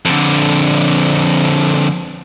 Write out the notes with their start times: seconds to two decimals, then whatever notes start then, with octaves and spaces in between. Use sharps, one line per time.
0.05 F2 D3